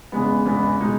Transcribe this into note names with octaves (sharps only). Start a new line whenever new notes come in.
E2 C#3 G#3 B3
E2 C#3 G#3 B3
B2 G#3 D#4